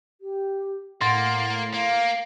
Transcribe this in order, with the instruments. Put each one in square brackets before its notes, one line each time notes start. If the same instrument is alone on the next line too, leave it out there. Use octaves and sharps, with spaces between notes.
[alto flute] G4
[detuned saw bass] A2 [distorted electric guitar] A#3 [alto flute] F#5 [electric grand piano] C6 A6
[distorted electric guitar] A#3 [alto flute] F5